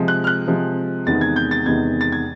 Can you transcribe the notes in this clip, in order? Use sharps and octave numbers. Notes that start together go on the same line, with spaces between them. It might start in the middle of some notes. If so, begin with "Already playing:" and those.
Already playing: C3 F3 G#3
F#6
F6
F#6
C3 F3 G#3
E2 C3 D#3 G#3 B3 A6
G#6
G6
A6
E2 C3 D#3 G#3 B3 G#6
A6
G#6